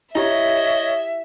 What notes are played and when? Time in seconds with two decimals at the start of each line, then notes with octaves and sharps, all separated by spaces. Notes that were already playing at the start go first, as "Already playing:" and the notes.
0.15 E4 G4 C#5 D#5 E5